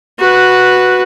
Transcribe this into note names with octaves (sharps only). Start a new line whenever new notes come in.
F#4 B4